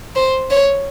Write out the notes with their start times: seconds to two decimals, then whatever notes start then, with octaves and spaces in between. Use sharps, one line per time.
0.16 C5
0.50 C#5